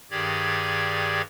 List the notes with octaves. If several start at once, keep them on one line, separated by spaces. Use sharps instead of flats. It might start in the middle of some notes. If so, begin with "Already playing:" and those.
G2 D#3 G4 G#4 D5 G#6